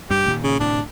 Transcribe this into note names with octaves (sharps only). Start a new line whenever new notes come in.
G2 G3 G4
A#2 D#3
C#3
D1 A2 C3 D4